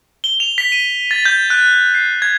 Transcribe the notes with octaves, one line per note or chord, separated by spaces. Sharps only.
G7
F7
B6
D#7
A6
G6
F#6
C7
G#6